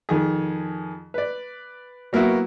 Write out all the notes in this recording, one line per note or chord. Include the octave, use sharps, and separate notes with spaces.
F2 D#3 G#4
B4 D5
F#3 A#3 B3 E4 F#4